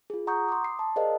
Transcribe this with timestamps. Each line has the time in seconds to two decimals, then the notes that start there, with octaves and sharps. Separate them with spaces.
0.10 F4 G#4
0.27 F#5 A#5 C#6 D#6 G6
0.48 C6 D6 D#6
0.64 C7
0.79 A5
0.96 G#4 A#4 C5 D5 D#5 F5